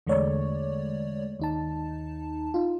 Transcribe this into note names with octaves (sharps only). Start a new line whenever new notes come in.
E2 D3 G#3 A3 C#5 D5
D#2 D#4 A5
D#4 F4